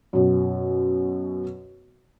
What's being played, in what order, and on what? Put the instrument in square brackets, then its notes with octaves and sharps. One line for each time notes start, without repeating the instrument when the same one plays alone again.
[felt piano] F#2 B2